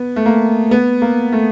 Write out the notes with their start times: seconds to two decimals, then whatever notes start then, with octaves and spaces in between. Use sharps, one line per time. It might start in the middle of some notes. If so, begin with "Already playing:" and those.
Already playing: B3
0.16 A3
0.26 A#3
0.71 B3
1.02 A#3
1.33 A3